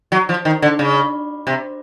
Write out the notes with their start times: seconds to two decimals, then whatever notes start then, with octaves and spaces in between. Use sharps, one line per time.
0.12 F#3
0.29 F3
0.45 D#3
0.62 D3
0.79 C#3
1.47 C3